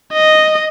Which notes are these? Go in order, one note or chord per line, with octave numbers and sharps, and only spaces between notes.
D#5